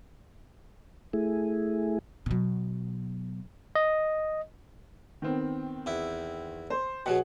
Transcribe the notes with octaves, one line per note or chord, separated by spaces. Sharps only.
A3 E4 G#4
B2 F#3
D#5
D#3 B3 C4
E2 E4
C5
B2 F#3 G#4 F#5